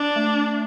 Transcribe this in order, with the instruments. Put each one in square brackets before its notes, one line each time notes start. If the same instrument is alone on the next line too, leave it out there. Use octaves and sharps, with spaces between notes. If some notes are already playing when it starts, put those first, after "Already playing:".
Already playing: [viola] D4
[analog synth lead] A3